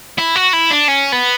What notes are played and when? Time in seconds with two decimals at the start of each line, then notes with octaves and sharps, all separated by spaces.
0.18 E4
0.35 F#4
0.53 E4
0.71 D4
0.88 C#4
1.12 B3